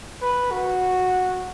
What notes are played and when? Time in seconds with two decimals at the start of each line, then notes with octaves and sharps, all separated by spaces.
0.22 B4
0.51 F#4